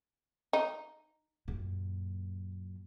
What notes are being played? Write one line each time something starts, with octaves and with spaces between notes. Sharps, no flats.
D#4
F#2 A#2